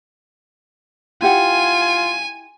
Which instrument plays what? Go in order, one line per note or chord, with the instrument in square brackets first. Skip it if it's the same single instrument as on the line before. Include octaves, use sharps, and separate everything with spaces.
[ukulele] E4 G4 F#5 [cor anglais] F4 [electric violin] G#5